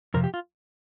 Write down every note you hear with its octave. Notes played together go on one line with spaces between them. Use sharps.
F2 C3 F3 A#4
G4
F4